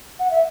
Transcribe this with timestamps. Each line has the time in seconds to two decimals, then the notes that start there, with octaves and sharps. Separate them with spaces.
0.19 F#5
0.31 E5